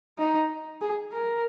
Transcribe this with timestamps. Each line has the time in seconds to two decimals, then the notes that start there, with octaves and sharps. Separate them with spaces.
0.18 D#4
0.82 G#4
1.12 A#4